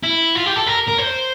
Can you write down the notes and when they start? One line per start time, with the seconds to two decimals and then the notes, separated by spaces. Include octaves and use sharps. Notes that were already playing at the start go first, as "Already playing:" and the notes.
0.03 E4
0.36 F4
0.46 G4
0.56 A4
0.67 A#4
0.88 A#4
0.98 C5